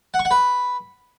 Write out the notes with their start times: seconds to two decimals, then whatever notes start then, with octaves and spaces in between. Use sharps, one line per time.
0.14 F#5
0.19 C#6
0.25 F#5
0.31 B4